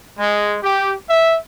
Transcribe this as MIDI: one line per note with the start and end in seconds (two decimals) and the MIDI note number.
0.19 0.58 56
0.63 0.95 67
1.10 1.38 76